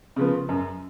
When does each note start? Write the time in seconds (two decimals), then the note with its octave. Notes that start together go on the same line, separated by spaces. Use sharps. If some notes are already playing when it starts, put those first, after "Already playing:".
0.16 C#3 F3 B3
0.49 F#2